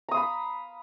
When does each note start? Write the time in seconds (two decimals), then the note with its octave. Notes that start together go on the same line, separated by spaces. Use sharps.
0.09 A#5
0.11 D#6
0.14 F5
0.17 B5